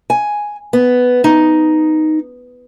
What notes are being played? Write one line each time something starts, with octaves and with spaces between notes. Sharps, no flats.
G#5
B3
D#4